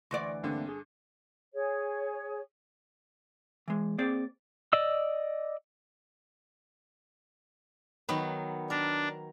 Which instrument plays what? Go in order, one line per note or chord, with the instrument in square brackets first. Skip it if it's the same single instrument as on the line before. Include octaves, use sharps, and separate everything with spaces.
[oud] D2 E3 D5 [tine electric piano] C6 C#6 A#6
[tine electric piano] G1 A#3 C4 [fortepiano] G2 D3
[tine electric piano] G#4
[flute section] G#4 C#5
[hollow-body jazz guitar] E3 G#3
A#3 C4 G#4 D5
[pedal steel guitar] D5 D#5 E6
[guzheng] D#3 F#3 B3
[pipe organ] D4 [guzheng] A#4